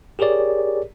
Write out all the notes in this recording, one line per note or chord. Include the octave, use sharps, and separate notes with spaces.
G4 G#4 A#4 C#5 D5